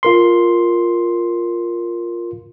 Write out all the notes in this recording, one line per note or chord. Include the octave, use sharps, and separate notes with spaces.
F4 A#4 C6